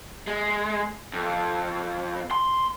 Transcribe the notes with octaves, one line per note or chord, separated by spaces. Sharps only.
G#3
F2
C6